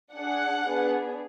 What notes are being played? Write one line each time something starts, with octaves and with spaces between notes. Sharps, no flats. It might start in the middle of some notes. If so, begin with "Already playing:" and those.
D4 G#4 F#5
B3 D4 G#4